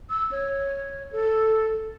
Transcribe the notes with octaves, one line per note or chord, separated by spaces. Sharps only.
E6
C#5
A4